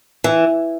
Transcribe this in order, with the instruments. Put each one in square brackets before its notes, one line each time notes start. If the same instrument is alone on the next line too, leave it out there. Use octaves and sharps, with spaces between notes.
[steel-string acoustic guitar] E3